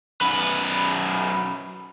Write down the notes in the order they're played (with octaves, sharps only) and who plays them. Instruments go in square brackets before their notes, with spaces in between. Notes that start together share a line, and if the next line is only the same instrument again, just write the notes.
[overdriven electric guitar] F#2 B4